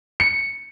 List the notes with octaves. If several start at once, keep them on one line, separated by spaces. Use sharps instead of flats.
C#7